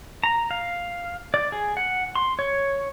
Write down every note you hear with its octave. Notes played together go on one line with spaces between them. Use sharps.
A#5
F5
D5
G#4
F#5
C6
C#5